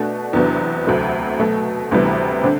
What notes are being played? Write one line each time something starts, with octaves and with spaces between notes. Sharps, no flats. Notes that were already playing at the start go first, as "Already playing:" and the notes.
Already playing: B2 A3 D4 F#4
E2 C3 F#3 B3 D4
D2 C3 F#3 A3
B2 F#3 A3
D2 C3 E3 G3 B3
D3 C4